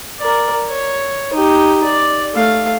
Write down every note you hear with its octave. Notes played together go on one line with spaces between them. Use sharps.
A#4 D5
C#5
D#4 G4
D5
A3 F5